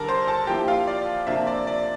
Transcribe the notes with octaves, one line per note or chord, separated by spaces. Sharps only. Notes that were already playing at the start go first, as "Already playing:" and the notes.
Already playing: D3 G3 D4 A#4 A5 A#5
C5 C6
A4 A5
F3 A#3 E4 G4 G5
F4 F5
D5
C3 F3 A#3 D4 F4 E5
D5
D5